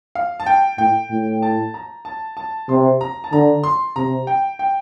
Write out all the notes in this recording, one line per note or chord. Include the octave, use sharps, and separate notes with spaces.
F5
A5
G5
A2 G5
A2
A5
A#5
A5
A5
C3 C6
A#5
A5
D3 A#5
C6
C3 A#5
G5
G5